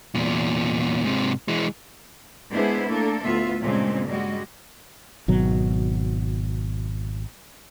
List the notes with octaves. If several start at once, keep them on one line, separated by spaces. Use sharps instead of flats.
E2 A#2
G#2 C3
E3 G#3
G#3 B3 D4 E4 G#4 C5
A3 A#3 D4 A4
D2 A2 B3 F4 E5
G2 A#2 C#3 G#3 C4 C#4
G3 G#3 F#4 D#5
G#1 B2 F#3